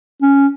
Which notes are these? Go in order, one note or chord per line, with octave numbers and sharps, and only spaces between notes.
C#4